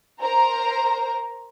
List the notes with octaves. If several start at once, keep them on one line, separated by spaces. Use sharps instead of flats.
A#4 C5 A#5